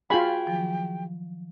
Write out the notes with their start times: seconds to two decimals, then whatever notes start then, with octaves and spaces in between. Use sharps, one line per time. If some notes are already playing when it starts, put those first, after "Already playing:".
0.10 F4 F#4 G#4 G5 B5
0.46 D#3 F3 F#3